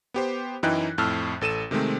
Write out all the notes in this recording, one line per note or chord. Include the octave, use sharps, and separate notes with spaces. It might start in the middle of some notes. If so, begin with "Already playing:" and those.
B3 G4 C5
F#2 E3 D#4 E4 G5 F#6
F2 A2 A5 E6 F6
A1 A4 D#7 E7
C3 D#3 G#3 A3 C4